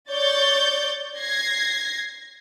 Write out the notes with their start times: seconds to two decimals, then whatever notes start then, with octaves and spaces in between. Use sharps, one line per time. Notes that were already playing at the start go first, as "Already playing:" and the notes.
0.11 C#5 D5 G6 A6
1.18 G#6 A#6 C7